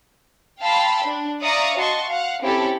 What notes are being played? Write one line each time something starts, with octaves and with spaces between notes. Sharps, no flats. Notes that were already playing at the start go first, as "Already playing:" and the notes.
F5 G5 A5 B5 C6 E6
D4
D5 E5 F5 A#5 C#6 D#6
F#4 D#5 A5 C6 C#6
F5 F#5
C4 C#4 E4 G4 A4